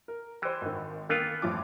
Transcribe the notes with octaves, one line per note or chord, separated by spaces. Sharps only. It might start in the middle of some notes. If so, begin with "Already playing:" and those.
A#4
E3 G4 C5
G#1 D#3
D#3 E3 A#3 B3 F4
A1 F3 D6